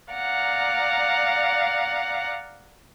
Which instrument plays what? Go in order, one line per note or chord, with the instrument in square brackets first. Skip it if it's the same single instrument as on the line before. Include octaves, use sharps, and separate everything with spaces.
[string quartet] D5 F5 F#5 A#5